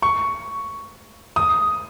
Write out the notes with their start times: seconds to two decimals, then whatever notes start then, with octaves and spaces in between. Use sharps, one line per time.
0.02 C#6
1.36 D#6